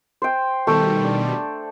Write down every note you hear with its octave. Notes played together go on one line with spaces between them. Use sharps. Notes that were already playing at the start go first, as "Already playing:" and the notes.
C5 G5
B2 D#3 G3 A3 G5
D4